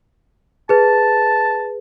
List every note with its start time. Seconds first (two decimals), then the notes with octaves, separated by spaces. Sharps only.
0.69 G#4 B4 A5